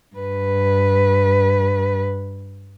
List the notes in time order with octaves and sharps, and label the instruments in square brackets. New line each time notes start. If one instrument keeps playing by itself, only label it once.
[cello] G2 B4